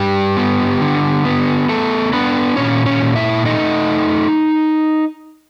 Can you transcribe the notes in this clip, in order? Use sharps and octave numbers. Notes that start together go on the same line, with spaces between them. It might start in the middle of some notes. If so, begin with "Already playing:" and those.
Already playing: G2 G3 G4
B3
D3
B3
A3 B3 A4
B3 D4 B4
A#2 C#4 C#5
C#4 C#5
A#2
E4 E5
A3 D#4 D#5